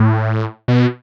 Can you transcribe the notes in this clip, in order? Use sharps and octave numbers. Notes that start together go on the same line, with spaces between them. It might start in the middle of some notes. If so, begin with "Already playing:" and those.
Already playing: A2
B2